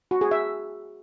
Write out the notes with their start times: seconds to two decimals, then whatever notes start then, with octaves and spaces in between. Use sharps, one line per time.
0.11 F#4
0.21 G#4
0.31 E5